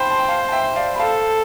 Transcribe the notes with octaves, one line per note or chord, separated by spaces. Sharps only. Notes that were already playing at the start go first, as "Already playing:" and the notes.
Already playing: C5 F5 G5 A5 B5
A5 C6
G5
F5 A5
A5
E5 G5
D5 F5
B5
A4 F5 A5